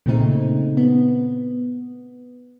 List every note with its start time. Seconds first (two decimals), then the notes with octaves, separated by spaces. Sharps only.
0.06 A#2 C#3 A3 C4 D#4
0.77 B3